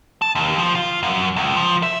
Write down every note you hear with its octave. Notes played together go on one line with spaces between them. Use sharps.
A5
D#2
F3
F4
F#2
C#2
F3
E5